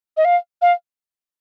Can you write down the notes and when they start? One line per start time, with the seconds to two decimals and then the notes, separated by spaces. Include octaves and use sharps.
0.17 D#5
0.25 F5
0.62 F5